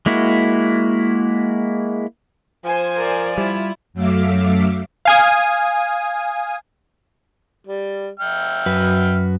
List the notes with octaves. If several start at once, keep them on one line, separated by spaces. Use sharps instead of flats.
G#3 A#3 E4 F#4
F3 C5 G#5
A#4 D5
G3 E4 F4
F#2 F#3 A3 E5 F5 D6
F5 G#5 D#6
G3
E5 G5 F6
F#2 F#4 B4